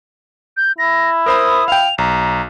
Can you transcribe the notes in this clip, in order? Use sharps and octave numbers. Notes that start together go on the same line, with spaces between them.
G6
E4 A#6
A#4 C5 B5 D#6
F5 G5 F7
B1 A#5